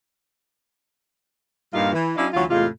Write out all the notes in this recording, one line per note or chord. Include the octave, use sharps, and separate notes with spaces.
G2 A#2 G3 D#4 F4 F5
E3
F#3 C#4 D4 E4 D#5 F5
D2 E3 F#3 F4
E2 A2 C3 G#3 F4